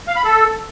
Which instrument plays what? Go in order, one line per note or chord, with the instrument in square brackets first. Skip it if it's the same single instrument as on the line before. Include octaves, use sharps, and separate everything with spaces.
[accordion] F5
B5
A4